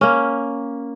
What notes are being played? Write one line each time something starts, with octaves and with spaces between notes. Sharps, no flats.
A#3 C#4